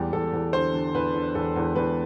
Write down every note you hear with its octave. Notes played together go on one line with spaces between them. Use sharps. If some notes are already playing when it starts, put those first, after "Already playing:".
Already playing: E2 G3 G4
E2 A4
E2
D3 C5
D3
E2 B4
D3
E2 A4
E2
E2 B4